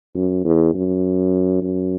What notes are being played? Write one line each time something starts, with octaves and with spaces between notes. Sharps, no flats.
F#2
E2
F#2
F#2